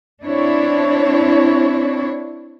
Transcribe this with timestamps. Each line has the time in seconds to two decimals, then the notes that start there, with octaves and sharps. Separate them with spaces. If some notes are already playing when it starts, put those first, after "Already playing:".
0.24 C4 D4 E4 C#5